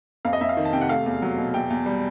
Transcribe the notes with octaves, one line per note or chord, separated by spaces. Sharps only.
F2 F5
D#5
F2 E5
F5
D#3
A5
C3 G5
F#5
A3 F5
E2
F#3
B2
E2 G5
E2
G3